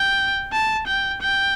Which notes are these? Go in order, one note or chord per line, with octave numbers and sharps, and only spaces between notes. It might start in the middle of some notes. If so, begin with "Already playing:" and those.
Already playing: G5
A5
G5
G5